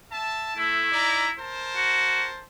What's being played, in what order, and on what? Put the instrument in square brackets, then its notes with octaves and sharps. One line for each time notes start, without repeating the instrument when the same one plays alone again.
[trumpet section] E5 A5
[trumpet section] A3 [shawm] E4
[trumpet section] D#4 D5 A#5
A#4 C5 A5
[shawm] F#4